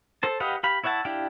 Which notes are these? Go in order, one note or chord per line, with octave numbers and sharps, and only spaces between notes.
A4 C5 A5
G4 B4 D#5 F5 F#5
G4 F5 B5
E4 C#5 E5 F#5 A5
D4 E4 G4 F5 G5